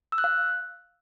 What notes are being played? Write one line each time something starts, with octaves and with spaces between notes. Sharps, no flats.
E6
F#6
F5